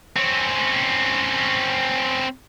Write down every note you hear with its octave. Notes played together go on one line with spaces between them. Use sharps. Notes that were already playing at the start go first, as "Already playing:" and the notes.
C4 C#4